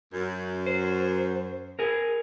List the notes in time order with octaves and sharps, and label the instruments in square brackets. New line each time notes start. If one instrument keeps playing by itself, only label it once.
[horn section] F#2
[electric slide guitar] C5
G#4 A#4